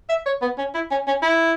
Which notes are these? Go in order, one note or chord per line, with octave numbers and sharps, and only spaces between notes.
E5
C#5
B3
C#4
E4
C#4
C#4
E4